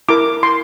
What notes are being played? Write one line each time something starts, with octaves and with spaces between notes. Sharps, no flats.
E4 A#4 D6
C6